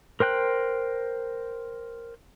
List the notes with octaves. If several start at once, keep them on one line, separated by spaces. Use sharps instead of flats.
A#4 C5 G5 F#6